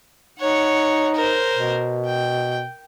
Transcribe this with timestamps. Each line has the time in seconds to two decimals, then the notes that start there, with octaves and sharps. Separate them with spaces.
0.39 D#4 C#5 F#5
1.15 A#4 C5
1.53 B2
2.05 G5